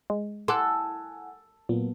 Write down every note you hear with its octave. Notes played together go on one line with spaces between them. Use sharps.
G#3
E4 A4 F#5 G#5 C6 D6 F#6
A#2 F#3 A#3 B3